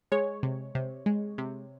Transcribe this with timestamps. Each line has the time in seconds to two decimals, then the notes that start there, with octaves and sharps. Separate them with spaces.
0.12 G#3 C#5
0.43 C3
0.75 C3
1.06 G#3
1.38 C3